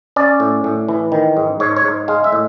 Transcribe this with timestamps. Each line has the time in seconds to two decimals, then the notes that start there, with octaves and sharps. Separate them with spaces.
0.16 C#4 D5
0.40 A2
0.64 A2
0.89 E3
1.12 D#3
1.37 G#2
1.60 G#2 C#5
1.76 C#5
1.85 G#2
2.08 G#3 F5
2.24 E5
2.32 A2